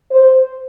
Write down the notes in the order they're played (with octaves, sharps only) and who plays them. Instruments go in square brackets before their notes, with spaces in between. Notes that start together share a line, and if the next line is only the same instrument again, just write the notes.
[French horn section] C5